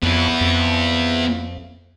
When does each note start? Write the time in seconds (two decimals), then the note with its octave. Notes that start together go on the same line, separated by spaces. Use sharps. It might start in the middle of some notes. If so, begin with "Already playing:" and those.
0.03 F2 B3 E4
0.41 F2